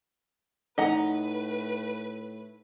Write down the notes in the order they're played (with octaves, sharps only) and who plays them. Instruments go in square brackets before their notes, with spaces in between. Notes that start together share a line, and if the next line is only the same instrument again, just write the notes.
[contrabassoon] A2 [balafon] D#4 [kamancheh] B4 [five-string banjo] D#5 F#5 A#5